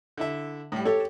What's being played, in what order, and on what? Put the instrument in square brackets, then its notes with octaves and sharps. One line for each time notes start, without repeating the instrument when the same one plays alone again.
[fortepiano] D3 E4 E5
A2 G3
[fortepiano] G4 C#5 [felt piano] A4